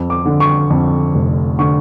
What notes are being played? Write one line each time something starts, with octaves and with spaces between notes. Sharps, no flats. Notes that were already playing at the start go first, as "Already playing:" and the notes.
Already playing: F2
D6
D3
C#6
F2
F1
D3 C#6